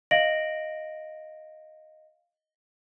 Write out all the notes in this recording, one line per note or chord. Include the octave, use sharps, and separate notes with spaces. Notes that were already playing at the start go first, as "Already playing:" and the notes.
D#5 F5 A#6 D7 F#7